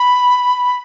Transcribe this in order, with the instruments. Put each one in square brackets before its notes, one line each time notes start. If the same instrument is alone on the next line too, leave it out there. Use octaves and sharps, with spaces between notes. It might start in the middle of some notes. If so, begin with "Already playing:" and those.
Already playing: [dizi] B5